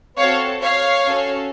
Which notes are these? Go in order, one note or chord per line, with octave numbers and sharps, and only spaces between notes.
C4 F#4 A4 C#5 F5
C#5 F5
C#4 F#4 A4